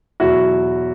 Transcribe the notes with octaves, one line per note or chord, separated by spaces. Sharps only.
E2 B2 F#3 E4 F#4